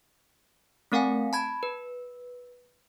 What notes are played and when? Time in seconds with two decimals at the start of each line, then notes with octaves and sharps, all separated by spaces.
0.92 A3 C4 A#4 F5 F#5 G#5
1.33 A5 B5 G#6
1.63 B4